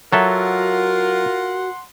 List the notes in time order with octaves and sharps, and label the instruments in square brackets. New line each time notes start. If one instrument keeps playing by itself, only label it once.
[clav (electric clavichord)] F#3 A4 E5 [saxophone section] F4 A#4 [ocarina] F#4 [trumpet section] F#5 C6